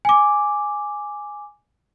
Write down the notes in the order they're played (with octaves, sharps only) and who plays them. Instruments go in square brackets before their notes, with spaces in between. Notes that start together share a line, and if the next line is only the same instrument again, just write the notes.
[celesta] G#5 D6